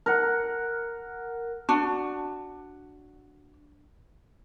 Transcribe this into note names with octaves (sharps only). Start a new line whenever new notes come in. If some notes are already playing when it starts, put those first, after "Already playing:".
A#4 F#5
D4 F#4